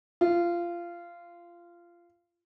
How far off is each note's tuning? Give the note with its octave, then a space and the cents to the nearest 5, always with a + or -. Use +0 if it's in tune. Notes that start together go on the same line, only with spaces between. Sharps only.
F4 -20